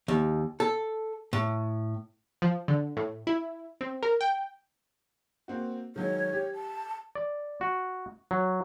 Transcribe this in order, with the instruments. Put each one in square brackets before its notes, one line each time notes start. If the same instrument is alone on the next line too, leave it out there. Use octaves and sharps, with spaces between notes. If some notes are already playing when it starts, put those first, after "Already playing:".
[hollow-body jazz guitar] D#2
A4
A2
[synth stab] F3
D3
A2
E4
C4
A#4
G5
[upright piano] A#3 C4 F#4
[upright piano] D#3 F#3 G#3 [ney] C#5
[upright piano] G4
[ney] A5
[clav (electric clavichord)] D5
F#4
F#3